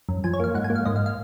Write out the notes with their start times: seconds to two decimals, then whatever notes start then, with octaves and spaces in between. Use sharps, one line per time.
0.09 F#2
0.24 F3 G#5
0.33 C#5
0.40 A#3 F5
0.54 G#2 F#5
0.64 G#5
0.70 A#3
0.75 F5
0.86 G#2 D#5
0.96 F5
1.06 F5